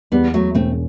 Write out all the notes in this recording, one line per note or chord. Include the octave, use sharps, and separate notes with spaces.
E2 G3 B3
F#3 A3
E1 A3 C4